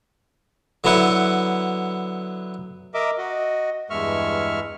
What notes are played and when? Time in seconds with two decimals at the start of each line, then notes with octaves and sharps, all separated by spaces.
0.84 D3 F#3 B3 E4 F#5
2.94 A#4 D#5 E5 D6
3.18 F#4 D#5
3.90 E2 G2 G#3 E5 C#6 F6